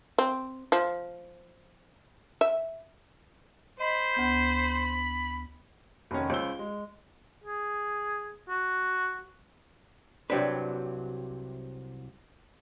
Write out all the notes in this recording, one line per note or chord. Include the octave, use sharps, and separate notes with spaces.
C4
F3
E5
C5 D#5 B5
D2 B3 G6
F1 D#3 C#4
C#2 C#4 C5 E6 G7
G#3
G#4
F#4
C2 C3 F#3 C4 D4 B4